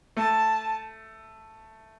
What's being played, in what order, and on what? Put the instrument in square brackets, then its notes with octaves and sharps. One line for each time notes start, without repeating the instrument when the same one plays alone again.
[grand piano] A3 [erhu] A5